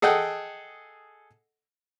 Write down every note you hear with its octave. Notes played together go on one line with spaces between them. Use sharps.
G#4 A4 D#5 F#5 G5